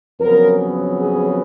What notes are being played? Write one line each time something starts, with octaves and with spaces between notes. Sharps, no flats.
F2 C#3 F#3 B3 A#4
G#4